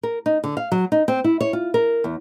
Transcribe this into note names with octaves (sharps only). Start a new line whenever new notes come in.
A#4
D#4
D3
F5
F#3
D#4
C4
E4
C#5
F4
A#4
E2